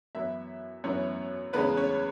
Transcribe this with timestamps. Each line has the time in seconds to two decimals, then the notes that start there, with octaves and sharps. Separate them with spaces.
0.15 F#2 E3 B3 E4 E5
0.84 F#2 E3 B3 C#4 C#5
1.53 E2 C#3 G#3 B3 C#4 B4
1.77 C#4 C#5